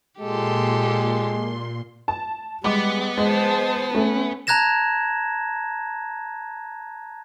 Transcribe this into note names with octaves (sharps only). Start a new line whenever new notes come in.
A#2 G#3 G4 A4 C6
A5
G3 G#3 B3 D6
G#3 C5 A5
A3 C#4
A5 A#5 F#6 G#6 A#6 E7